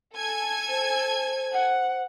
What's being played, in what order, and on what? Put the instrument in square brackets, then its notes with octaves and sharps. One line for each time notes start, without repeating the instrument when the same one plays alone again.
[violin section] A4 G#5 G#6
[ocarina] C5
[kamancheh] F#5